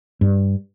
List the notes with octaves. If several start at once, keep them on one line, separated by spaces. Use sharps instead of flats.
G2